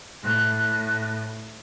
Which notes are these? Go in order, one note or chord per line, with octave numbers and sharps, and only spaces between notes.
A2 F#6